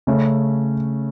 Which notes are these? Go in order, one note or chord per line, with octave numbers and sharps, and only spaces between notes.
C#3 A3 C#4